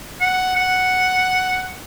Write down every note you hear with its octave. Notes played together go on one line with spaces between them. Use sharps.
F#5
F#5